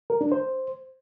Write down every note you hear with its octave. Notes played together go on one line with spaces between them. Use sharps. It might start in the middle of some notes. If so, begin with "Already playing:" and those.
A#4
D4
C5